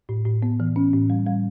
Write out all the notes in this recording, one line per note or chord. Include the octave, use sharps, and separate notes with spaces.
A2
A2
B3
E3
C#4
A2
G3
G3